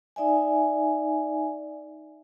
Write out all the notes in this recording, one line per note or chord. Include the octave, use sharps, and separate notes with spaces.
D#4 D5 E5 G#5